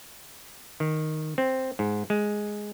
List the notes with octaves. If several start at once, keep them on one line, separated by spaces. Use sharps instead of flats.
D#3
C4
G#2
G#3